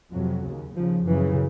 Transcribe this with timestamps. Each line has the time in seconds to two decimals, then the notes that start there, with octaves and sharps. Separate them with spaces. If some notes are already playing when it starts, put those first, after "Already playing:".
0.13 F2 C3 F#3
0.45 D#2 C#3
0.76 D#2 C#3 F3
1.06 F#2 C#3 E3